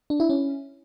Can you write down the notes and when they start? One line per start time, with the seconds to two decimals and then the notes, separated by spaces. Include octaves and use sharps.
0.10 D4
0.20 E4
0.30 C#4